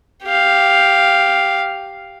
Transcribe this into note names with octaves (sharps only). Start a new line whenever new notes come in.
G4 F5